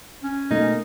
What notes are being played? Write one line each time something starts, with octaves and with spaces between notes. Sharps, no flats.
C#4
B2 A3 A#3 D#4